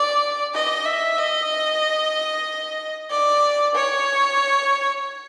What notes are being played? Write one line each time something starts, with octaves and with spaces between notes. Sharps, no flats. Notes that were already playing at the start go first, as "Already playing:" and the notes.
Already playing: D5
D#5
E5
D#5
D5
C#5